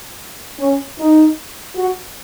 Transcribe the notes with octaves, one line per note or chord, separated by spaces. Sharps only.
C#4
D#4
F#4